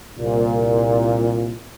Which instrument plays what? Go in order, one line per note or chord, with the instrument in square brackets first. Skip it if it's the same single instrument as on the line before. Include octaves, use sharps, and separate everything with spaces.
[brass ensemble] C2 A#2